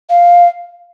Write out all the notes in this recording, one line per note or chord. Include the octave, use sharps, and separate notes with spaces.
F5